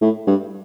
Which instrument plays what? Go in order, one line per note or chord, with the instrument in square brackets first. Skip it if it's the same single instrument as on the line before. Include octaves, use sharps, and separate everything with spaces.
[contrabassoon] A2
G2